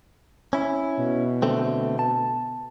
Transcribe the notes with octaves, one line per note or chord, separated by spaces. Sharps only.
C#4 E4
B2
D3 A3 C4
A5